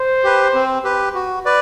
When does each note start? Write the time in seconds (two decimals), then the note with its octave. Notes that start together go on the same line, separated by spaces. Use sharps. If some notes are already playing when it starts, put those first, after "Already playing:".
Already playing: C5
0.24 G4 B4
0.54 C4
0.84 G4 B4
1.15 F#4
1.45 B4 D5